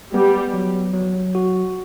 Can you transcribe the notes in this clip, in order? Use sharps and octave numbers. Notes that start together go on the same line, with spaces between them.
G3 B3
F#3
F#3
F#4